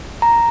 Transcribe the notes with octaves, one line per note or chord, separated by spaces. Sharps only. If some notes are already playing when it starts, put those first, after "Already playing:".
A#5